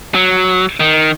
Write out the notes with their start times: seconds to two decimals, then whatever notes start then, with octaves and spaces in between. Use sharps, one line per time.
0.15 F#3
0.80 D#3